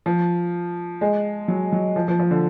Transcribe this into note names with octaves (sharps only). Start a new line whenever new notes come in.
F3
G#3
F#3
F#3
F3
F3
F3
D3